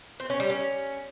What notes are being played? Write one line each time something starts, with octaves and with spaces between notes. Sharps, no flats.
C4
C#4
G3
C#4